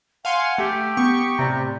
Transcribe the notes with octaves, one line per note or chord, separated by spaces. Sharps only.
F5 F#5 G#5 C6
A3 G4
B3 C#6
A2 C3 D5 A#5